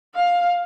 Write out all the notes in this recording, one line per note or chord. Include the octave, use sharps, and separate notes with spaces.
F5